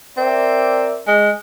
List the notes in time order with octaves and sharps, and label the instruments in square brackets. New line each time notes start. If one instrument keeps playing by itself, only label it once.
[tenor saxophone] C4 [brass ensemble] A#4 D5 E5
[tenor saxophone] G#3